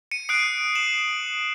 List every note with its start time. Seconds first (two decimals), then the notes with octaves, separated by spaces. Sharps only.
0.11 C#7 D#7
0.29 D#6 F#6 C7 D7
0.75 E7 F#7